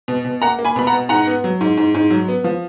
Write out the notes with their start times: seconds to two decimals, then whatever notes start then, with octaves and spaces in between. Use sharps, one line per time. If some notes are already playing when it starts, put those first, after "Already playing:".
0.08 B2
0.25 B2
0.42 A#3 F#5 A#5
0.59 A#3
0.65 G#5 B5
0.76 B2 B5
0.87 F#5 A#5
0.93 B2
1.09 G#2 F#5 A#5
1.27 B3
1.44 F#3
1.61 G#2
1.77 G#2
1.94 G#2
2.10 F#3
2.28 B3
2.44 F3